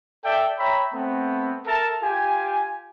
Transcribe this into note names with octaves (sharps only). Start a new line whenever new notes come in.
A4 D5 E5 G5
C#5 E5 G5 A#5 B5
A3 B3 C4
A4 A#4 E5 A5
F4 G4 G#5